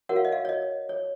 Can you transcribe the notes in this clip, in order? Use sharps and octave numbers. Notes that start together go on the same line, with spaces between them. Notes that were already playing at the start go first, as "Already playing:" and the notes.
F#4 A#4 C#5 F#5
F5
D#5
F5
C#5
D#5
C#5